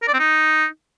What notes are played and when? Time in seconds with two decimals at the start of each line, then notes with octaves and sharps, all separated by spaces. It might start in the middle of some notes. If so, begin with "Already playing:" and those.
0.02 A#4
0.08 D5
0.14 C4
0.19 D#4